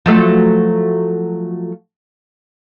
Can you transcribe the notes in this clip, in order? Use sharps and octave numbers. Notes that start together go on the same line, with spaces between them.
F3 F#3 A3